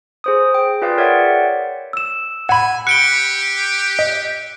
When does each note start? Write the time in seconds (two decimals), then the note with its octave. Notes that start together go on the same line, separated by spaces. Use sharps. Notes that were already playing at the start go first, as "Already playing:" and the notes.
0.24 G#4 C5 D#6
0.54 G5
0.82 F4 G#4 B4 D5 F5 G5
0.98 A#4 C#5 D5 E5 F#5 G5
1.93 E6 E7
2.49 F#5 G#5 B5
2.87 G4 F#6 C#7 D7 G7
3.99 D#5